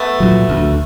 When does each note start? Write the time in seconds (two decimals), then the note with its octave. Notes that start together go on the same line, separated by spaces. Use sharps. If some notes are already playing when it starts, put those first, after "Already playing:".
Already playing: A3 B3
0.20 A#2 F#3
0.49 D2